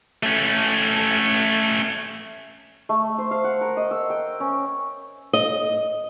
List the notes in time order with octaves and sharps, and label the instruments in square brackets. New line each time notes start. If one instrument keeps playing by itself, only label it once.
[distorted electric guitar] A3 C#4
[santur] A3
C5
F5
F#5
A#4
D#5
E6
G5
C#4
[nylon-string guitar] D#5